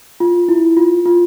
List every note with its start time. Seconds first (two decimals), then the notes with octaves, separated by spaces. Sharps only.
0.20 F4
0.49 E4
0.77 F4
1.06 F4